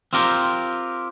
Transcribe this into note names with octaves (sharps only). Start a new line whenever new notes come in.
C4 F4 G4 A#4